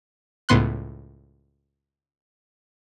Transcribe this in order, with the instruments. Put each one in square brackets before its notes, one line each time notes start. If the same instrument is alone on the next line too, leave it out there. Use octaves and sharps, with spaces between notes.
[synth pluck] C#2 A2 B3 C6 F#6